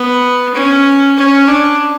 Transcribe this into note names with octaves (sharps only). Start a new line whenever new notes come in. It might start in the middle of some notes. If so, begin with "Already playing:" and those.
Already playing: B3
C#4
C#4
D4